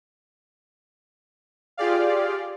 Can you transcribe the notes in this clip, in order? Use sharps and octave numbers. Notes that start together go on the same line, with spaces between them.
F4 G4 G#4 D5 F5